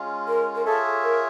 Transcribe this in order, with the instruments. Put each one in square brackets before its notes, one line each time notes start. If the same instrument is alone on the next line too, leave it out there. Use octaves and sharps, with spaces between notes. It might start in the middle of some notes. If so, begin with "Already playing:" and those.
Already playing: [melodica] G#3 C#4 F4
[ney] A#4
A#4
[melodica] F4 G#4 C#5 E5 [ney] A4
[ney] A#4